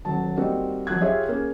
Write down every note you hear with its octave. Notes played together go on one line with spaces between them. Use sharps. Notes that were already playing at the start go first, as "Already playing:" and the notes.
D#1 F#3 A5
G3 A#3 C4 D#4 F#4
F3 F#3 F#6 G#6
F4 G4 G#4 C#5 E5 F5
A#3 C#4 G#4